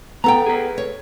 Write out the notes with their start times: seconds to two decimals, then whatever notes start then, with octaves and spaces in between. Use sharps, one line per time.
0.24 B3 A4 G5 A#5
0.46 G#4 B4
0.78 C#5